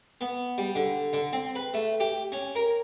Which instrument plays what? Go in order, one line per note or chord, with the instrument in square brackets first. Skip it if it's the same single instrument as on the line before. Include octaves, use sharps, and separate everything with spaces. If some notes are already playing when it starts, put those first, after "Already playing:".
[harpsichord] B3
G3
D3
D3
C4
B4
A3
G4
C#4
A#4